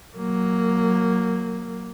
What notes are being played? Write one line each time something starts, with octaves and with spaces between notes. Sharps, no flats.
F#3 A#3